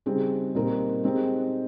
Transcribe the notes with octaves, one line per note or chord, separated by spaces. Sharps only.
C#3 G3 C4 D#4 G#4
A#2 G3 C4 D#4 A#4
G#3 C4 D#4 G4